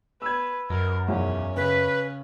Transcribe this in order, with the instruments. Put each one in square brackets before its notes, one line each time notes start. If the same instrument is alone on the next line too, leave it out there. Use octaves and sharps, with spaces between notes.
[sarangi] B4 [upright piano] E6 G#6
[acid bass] F#2 [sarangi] A#4
[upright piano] B1 E2 [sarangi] C#4
[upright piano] C#3 [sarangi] C#4 [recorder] B4